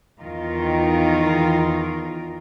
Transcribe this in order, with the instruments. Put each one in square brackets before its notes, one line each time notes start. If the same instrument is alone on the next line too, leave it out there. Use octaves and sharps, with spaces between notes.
[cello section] E2 D#3 F4 A#4